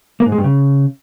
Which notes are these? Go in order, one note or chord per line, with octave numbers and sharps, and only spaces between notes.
A#3
G#2
G#3
G2
C#3